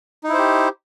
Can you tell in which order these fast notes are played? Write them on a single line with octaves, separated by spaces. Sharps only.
D#4 E4 C5 G4